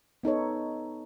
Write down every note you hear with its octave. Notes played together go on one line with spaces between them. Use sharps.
B3 D#4 A4 C#5